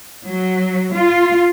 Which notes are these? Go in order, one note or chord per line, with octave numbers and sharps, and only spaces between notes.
F#3
F4